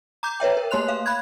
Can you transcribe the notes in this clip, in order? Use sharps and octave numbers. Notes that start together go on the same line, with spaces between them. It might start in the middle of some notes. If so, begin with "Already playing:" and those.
A#5 D6 G6
B4 C#5 E5 G5
A#4
A3 A#3 C#5 C6 F#6 F7
F5
B5 F#6 G#6